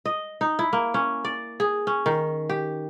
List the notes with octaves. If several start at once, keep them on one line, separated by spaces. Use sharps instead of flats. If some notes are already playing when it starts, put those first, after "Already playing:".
D#5
D#4
E4
A#3
C#4
D5
G#4
C#4
D#3
G4